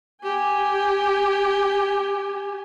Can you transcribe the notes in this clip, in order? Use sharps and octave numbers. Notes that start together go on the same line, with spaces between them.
G4 G#5